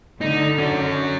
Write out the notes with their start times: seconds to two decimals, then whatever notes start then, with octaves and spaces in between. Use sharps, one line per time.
0.21 D3 D#4
0.58 C#4 F#4